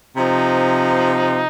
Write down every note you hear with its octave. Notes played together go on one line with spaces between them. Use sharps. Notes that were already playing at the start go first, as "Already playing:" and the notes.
C3 F3 D#4